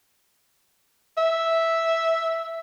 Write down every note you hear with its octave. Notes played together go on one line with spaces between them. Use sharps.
E5